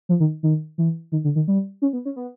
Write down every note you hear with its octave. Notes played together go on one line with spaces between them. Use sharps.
F3
D#3
D#3
E3
D#3
D3
D#3
G3
C#4
B3
C#4
B3